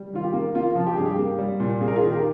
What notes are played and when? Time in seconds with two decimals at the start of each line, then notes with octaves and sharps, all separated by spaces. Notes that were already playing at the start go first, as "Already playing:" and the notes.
Already playing: G3
0.13 D#3 F4
0.24 G4
0.33 A#3
0.55 A#3 F4
0.75 F3
0.87 G4
0.96 G2 G#4
1.06 G4
1.18 A#3
1.39 G3
1.60 A#2
1.81 A#3 G#4
1.87 A#4
1.96 F4 G#4
2.02 D#3
2.11 G4 A#4